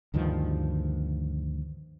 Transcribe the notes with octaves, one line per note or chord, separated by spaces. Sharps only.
D2 G2 D#3 F3